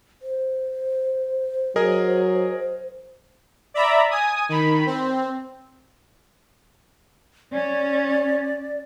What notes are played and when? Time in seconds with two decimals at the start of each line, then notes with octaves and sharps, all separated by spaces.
0.22 C5
1.76 F#3 G#4 A#4 D#5
3.74 D5 E5 A#5 B5
4.11 G#5 D#6
4.49 D#3 B5
4.86 C4
7.52 C#4 D5